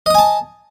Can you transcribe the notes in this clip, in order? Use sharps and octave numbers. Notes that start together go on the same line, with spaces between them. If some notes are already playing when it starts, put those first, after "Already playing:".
D#5 G#5 A5 D#6